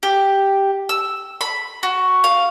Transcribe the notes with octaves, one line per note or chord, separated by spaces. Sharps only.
G4
E6
B5
F#4
F5